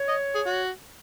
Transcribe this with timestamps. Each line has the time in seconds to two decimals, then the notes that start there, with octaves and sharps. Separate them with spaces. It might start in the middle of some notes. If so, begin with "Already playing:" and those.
Already playing: C#5
0.09 D#5
0.35 G#4
0.46 F#4